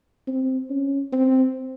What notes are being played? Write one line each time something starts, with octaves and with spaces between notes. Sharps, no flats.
C4
C#4
C4